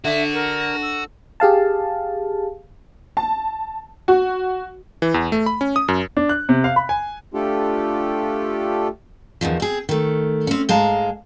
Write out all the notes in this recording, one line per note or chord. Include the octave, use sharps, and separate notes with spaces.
D3 F#4 E5
A#4
E6
G4 G#4 F5 A5
A5
F#4
E3
E2
A3
B5
C#4
D#6
F#2
D4
F#6
C3
F5
B5
G#5
A3 D4 F4 G4 A4
E2 A#2 D#3 F3
C4 G#4
D#3 A3
C4 C#4
G#2 G#3 F5 A5 A#5